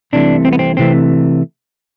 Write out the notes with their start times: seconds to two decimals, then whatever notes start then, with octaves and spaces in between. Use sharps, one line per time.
0.13 C2 C3 E3 A3 D4
0.45 C4
0.53 B3
0.59 C4
0.77 C3 E3 A3 C4